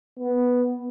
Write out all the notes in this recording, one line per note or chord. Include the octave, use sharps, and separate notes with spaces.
B3